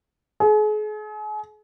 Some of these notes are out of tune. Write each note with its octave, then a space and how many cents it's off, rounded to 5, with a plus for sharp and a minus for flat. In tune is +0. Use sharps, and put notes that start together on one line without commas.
G#4 +40